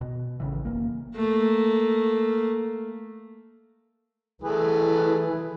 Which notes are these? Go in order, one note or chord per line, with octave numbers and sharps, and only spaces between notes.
B2
A1 C#3 E3
F1 D#2 A#3
A3 A#3
E3 A3 G#4 B4